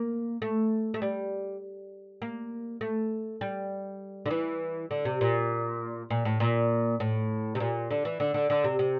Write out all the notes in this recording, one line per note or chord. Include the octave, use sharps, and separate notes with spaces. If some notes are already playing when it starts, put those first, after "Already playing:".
Already playing: A#3
A3
A3
G3
A#3
A3
G3
D3
E3
D3
C3
A#2
A#2
A2
A#2
A2
C3
A#2
D3
E3
D3
D3
D3
C3
C3